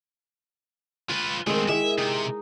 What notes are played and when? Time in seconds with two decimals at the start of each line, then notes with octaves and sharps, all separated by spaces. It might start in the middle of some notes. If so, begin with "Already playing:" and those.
1.10 F4 B4 G#5
1.47 D#3 G#3 A3 C4
1.69 G#3 E4 E5
1.98 C3 D#4